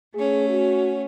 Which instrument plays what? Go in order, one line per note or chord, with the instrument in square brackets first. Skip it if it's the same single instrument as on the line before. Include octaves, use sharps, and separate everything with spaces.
[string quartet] A3 C#4 [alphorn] G#4
[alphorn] F#4